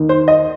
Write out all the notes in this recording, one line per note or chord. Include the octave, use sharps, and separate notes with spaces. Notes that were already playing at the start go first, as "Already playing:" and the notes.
Already playing: D#2 D#3
C5
D#5